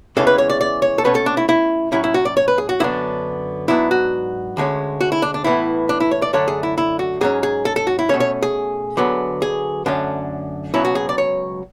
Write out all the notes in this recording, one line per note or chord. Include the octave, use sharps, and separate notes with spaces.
E2 C#3 E3 G#3 C#4 A4
B4
C#5
D5
D5
C#5
A4
B2 A3 C#4 B4
A4
D4
E4
E4
A2 F#3 C#4 E4
E4
F#4
D5
C#5
B4
G#4
F#4
F#2 D3 F#3 B3 D4 E4
G#2 F#3 B3 D4 E4
F#4
D2 D3 G#3 C#4
F#4
E4
D4
D4
A2 E3 B3 E4
D4
E4
C#5
D5
F#2 D3 A3 D4 C#5
G#4
E4
E4
F#4
G#2 F#3 C#4 G#4
G#4
A4
A4
F#4
E4
B2 A3 C#4 C#5
C#5
G#4
D2 D3 F#3 B3
G#4
F#2 D3 A3 C#4 D4
C#2 B2 F#3 C#4 E4
F#4
G#4
D5
C#5